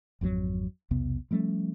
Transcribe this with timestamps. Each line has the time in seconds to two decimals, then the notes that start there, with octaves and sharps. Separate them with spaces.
0.21 G#1 F2 B2 F#3
0.91 B1 E2 C3 B3
1.31 F3 G3 A3 C#4